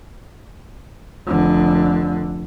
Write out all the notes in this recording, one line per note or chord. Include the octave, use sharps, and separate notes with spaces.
F1 D3